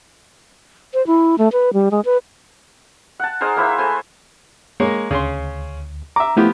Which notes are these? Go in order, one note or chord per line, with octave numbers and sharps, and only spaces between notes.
C5
E4
A3
B4
G3
G#3
B4
F#5 A5
D#4 G#4 A#4 C5
A#3 E4 C5 E5
A3 C5 G#5
G#3 A#3 C#5
D2 C#3 C#4 C6
E5 A#5 D6
F3 A3 B3 E4 G4